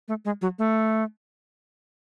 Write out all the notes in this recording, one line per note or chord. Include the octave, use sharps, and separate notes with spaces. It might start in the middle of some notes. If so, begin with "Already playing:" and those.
A3
G#3
F#3
A3